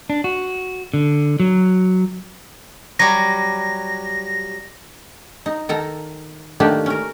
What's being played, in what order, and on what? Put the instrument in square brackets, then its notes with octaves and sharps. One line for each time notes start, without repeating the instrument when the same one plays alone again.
[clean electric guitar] D4
F#4
D3
F#3
[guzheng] F#3 G3 [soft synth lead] A#6
[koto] D#4
D#3 A4 A#5
D#3 A3 A#3 D4 G4
C#4 A#4